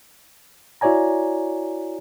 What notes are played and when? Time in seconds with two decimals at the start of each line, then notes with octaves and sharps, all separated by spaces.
0.81 E4 F#4 C#5 D5 G#5 A#5